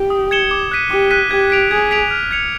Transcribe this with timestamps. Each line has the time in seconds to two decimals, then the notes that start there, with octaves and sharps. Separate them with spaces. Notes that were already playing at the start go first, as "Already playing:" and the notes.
Already playing: G4
0.10 D#6
0.31 G#6 C#7 E7 G7
0.51 D6
0.71 F#6 B6 D#7
0.91 G4 D6
1.11 F#6 B6 D#7
1.30 G4 G#6
1.50 B6 D7 F7
1.71 G#4 G#6
1.91 B6 D7 F7
2.11 F6
2.31 G#6 C#7 F7